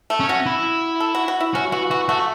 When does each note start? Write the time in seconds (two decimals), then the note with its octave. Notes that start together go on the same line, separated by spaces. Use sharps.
0.10 A3
0.20 C#4
0.29 F#4
0.46 E4
1.00 A4
1.15 F#4
1.28 F#4
1.40 E4
1.54 C#4 F#4
1.72 E3 F#4
1.90 E3 F#4
2.08 A3 F#4